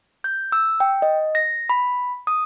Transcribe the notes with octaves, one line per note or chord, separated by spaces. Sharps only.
G6
E6
G5
D#5
A#6
B5
D#6